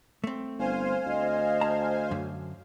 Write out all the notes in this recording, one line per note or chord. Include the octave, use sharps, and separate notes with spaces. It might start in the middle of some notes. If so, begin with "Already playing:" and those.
A3 C4
G1 C5 F5 G#5
D2 D#5
A5 A#5
F#2 D3